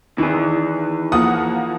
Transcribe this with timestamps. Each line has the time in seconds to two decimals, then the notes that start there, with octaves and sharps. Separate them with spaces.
0.18 D#3 E3 G#4
1.12 F3 A#3 F#5 D#6